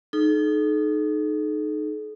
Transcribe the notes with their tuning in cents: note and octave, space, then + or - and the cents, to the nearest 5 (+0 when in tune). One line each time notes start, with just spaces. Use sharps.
D#4 -20 A4 -45